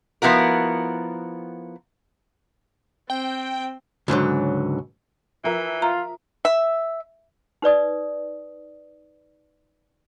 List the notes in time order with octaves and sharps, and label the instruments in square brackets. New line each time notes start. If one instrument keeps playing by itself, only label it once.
[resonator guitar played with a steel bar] F3 B3 E4 F#4 A#4
[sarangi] C4 [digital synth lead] G5
[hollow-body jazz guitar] C#2 G#2 D3 F#3
[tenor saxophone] E3 [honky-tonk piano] F3 A#4 E5
[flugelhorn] F4 [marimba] A#5
[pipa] E5
[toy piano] D#4 B4 D5 D#6